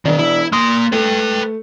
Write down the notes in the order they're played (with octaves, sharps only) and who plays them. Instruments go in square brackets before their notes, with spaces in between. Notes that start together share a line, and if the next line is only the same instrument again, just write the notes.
[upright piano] E1 D4 [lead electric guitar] D#3
[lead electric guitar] E4
[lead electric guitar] A#3 C6 [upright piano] D#6
[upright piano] A3 [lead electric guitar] B4 G5